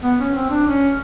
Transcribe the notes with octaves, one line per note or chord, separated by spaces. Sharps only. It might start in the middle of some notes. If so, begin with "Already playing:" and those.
B3
C#4
C4
D4
C#4